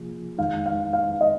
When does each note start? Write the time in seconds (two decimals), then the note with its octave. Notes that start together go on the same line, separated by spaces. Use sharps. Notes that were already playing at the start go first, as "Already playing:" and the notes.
Already playing: C3 F3 A#3 F4 G#4
0.38 F2 D#3 G#3 D#4 F5
0.66 F5
0.93 F5
1.21 D#5